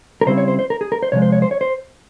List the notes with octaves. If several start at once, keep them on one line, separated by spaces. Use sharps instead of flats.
A#4
C#3 G3 C4 E4 C5
C#5
C5
C5
A#4
G#4
A#4
C5
C3 F3 G#3 C#5
C5
C#5
C5
C#5
C5